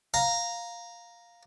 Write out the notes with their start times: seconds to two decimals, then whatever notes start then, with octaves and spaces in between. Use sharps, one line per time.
0.14 F5 A#5